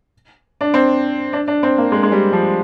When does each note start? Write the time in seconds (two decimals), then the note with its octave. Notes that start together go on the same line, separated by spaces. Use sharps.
0.61 D4
0.74 C4
1.33 D4
1.48 D4
1.63 C4
1.78 A#3
1.92 G#3
2.03 G#3
2.12 G3
2.32 F3